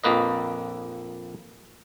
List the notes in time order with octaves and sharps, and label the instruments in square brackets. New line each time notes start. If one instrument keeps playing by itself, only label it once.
[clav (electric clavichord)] A#1 F2 A#3 B4 D#5